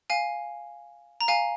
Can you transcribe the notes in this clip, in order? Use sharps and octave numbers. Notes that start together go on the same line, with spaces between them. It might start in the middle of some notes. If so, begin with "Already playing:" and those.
F5 G#5
A#5
F5 G#5